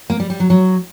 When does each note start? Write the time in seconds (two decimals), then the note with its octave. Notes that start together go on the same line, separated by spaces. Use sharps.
0.10 A#3
0.20 G3
0.30 G3
0.40 F#3
0.50 F#3